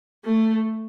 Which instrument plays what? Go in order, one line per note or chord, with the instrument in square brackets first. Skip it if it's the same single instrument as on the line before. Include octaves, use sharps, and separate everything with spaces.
[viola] A3